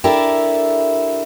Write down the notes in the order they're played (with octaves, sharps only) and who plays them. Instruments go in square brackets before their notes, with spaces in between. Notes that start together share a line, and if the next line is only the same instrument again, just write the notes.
[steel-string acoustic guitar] D4 E4 G4 A4 A#4